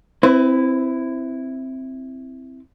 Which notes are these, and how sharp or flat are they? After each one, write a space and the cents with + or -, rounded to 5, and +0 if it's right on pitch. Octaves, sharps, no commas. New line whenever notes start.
C4 +0 E4 +0 B4 +30